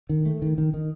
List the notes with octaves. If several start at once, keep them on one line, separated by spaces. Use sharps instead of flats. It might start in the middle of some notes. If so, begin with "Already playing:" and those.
D#3
A3
D#3
D#3
D#3